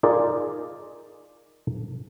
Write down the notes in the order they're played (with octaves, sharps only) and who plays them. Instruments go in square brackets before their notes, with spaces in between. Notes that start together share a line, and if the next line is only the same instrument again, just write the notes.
[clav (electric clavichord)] D#4 F4 G#4 A#4 D5